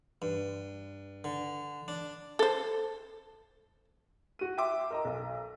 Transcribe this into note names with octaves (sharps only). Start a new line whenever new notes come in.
G2
D3
D4
A4 C5
F#4 D#7
E5 G5 C6 D6 E6
A#4 D#5 A#5
B1